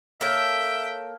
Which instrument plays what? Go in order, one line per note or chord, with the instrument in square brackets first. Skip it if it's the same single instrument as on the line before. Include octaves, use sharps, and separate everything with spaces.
[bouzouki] A#3 A4 C#5 [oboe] E5 [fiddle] G5